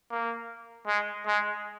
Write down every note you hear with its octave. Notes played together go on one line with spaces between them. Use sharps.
A#3
G#3
G#3